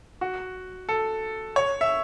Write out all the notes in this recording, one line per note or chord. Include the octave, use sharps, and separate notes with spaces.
F#4
A4
C#5
E5